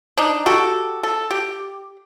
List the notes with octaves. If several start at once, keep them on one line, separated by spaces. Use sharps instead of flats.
D4 D#4
F#4 G4 A4
A4
G4